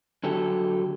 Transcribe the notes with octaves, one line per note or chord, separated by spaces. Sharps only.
D3 F#3 G4 A4